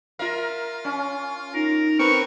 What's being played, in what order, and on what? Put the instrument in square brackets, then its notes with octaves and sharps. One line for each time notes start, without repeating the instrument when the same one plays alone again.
[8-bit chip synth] F4 F5 [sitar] A#4 E5
[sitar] C#4
[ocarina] D#4 [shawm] A#4
[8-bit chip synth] C4 A#4 B4 [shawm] C#6